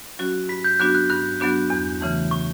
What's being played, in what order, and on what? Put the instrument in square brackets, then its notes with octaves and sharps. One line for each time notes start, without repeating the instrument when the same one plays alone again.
[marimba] F#3 C#4 F#4
[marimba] G2 [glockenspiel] B6
[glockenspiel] G6
[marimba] F#3 B3 D4 F#4 [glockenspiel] F#6
[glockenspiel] F#6
[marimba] G2 [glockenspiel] F#6
[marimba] F#3 B3 D4 F#4
E2
C#3 E3 A3
[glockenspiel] C#6